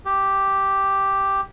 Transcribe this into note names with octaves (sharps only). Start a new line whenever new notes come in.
G4